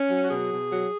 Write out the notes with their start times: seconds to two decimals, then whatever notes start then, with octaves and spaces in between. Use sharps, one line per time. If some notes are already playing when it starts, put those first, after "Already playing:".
Already playing: C#4
0.09 F#3
0.22 F#4
0.30 B2 G#4
0.50 B2
0.70 F#3